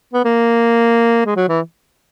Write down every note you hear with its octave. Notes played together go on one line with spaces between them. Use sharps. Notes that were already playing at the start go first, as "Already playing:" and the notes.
B3
A#3
G#3
F#3
E3